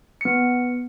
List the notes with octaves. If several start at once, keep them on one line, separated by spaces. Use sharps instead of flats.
B3 C#7